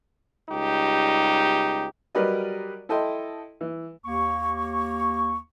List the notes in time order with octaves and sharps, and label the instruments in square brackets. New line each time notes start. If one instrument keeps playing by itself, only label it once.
[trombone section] C#2 G3 D#4 G4
[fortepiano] F#3 G3 A#4 B4 D5 D#5
E4 A4 D#5 G5 C6
E3
[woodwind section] D#2 A#3 C#6